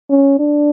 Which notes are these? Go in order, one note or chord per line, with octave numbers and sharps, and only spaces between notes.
C#4
D4